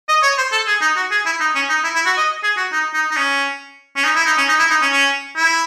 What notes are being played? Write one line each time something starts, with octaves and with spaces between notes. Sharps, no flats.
D#5
C#5
C5
A4
G#4
D#4
F#4
G#4
E4
D#4
C#4
D#4
E4
E4
F#4
D#5
G#4
F#4
D#4
D#4
D#4
C#4
C#4
D#4
E4
D#4
C#4
D#4
E4
D#4
C#4
C#4
E4